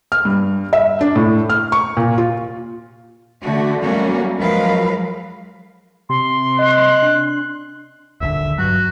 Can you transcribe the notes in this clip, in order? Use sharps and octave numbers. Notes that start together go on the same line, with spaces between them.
F6
G2
E5
D4
A2
F6
C#6
A#2
F4
D3 A3 F#4
F#3 G3 A3 A#3 C#4 F#4
F3 F#3 G#3 A#4 B4 F5
C3 C6
D#5 F#6
D4
D#1 A#1 D3 E5
G2 F#3 F#4